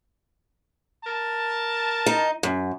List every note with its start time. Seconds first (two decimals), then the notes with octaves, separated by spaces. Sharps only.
1.05 A#4 A5
2.06 D#4
2.43 F#2